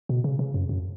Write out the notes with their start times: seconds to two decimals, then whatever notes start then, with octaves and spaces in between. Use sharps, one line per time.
0.09 B2
0.24 C#3
0.39 C#3
0.54 F#2
0.69 F#2